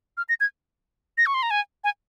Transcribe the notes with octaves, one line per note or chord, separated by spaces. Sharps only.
F6
A#6
G#6
A#6
C#6
C6
A#5
G#5
G#5